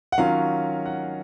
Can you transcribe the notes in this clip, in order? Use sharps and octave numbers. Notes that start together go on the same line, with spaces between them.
F#5
D#3 F#3 C#4 F4 F5
F#5